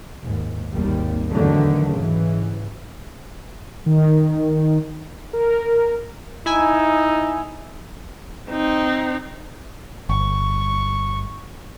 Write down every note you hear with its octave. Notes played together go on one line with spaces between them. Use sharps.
D#2 G#2
G#1 D#2 G3
E2 D3 D#3 F#3 A3
G#2 C#3 E3
D#3
A#4
D#4 E4 G#5 E6
C4 D#4
G1 C#6